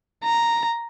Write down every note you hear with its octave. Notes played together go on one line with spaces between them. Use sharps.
A#5